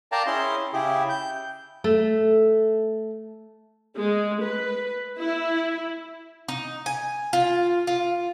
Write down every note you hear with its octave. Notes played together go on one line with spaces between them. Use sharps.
A#4 D5 F5 G5 A5 A#5
C#4 E4 G#4 C6
C#3 E4 G4 G#4
G6
A3
G#3
B4
E4
D#4
G#5
F4
F4